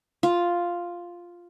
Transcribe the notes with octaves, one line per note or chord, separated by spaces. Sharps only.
F4